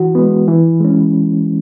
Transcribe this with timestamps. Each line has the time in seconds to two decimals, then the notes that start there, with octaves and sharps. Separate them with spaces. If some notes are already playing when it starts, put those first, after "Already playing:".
Already playing: E3 F#4
0.15 G#3 B3
0.48 E3
0.80 G#3 C#4